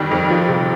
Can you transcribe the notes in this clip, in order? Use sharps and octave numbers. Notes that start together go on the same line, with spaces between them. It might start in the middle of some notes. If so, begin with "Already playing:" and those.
Already playing: F2 D#3 G3
F2
F3
C3